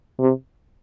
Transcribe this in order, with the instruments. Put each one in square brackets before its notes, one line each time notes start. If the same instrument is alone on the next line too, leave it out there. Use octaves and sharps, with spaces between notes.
[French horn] C3